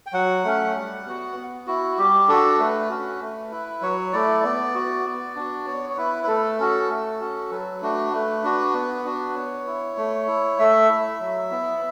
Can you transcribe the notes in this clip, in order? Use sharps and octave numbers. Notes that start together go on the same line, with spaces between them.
G5
F#3 F#5
A3 C#4
G3
B3 F#4
B3
E4 F#4
G3 G4
D4 F#4 A4
A3 B4
C#4 F#4
A3
E4
F#3 C#5
A3 E4 D5
B3 D5
F#4
B3
D4 F#4
B3 C#5
C#5
E4 B4
B4
A3 A4
C#4 F#4
A3
C#4 F#4
F#3 B4
A3 D4 F#4
A3
D4 F#4
B3
D4 F#4
B3 C#5
E4
A3
E4
A3 E5
E4
F#3
B3 E4